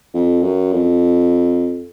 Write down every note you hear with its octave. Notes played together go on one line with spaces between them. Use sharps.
F2
F#2
F2